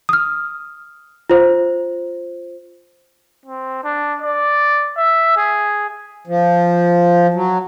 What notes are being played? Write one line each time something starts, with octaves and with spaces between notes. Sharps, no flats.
D#6 F6
F4 C5
C4
D4
D5
E5
G#4
F3
F#3